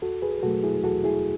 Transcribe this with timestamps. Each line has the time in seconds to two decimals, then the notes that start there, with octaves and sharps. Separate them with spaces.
0.02 E2 F#4 A4
0.22 G#4 B4
0.43 B2 F#3 A3 F#4 A4
0.64 E4 G#4
0.84 E2 F#4 A4
1.04 E4 G#4